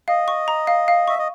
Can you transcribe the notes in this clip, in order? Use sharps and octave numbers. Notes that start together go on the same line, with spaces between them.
D#5 F5
C#6
A#5
F5
F5
E5 C#6
D#5